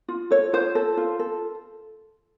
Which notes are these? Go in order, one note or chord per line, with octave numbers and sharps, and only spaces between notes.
F4
A4 C#5
F4 C5
A4
F4
A4